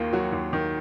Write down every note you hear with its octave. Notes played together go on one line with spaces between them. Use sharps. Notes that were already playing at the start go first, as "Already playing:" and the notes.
Already playing: D#2 D#3 A#3 F4
F#3 F#4
D#2
D#3